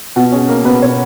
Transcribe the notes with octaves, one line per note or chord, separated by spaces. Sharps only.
B2 F#4
C#4 G#4
A#3 A#4
B2 B4
B2 C#5